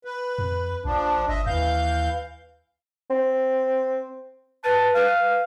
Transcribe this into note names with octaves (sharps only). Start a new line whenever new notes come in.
B4
F2
A#1 F3 D4
G1 D#5 E5
D#2 E3 F5 G6
C4
B4 A5
B4 F5